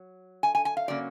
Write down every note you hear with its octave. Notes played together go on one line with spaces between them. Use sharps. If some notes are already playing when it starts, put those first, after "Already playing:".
Already playing: F#3
G#5
G#5
G#5
F5
C#3 F#3 A#3 C#4 D5